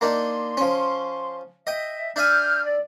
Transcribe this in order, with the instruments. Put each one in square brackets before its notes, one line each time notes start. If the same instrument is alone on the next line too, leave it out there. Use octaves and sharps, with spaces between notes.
[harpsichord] A#3 D4 D#4 [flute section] C6
[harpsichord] F3 C#4
[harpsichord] D#5 G5 [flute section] E5
[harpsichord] D4 E5 G#5 [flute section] F6 G6
[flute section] D5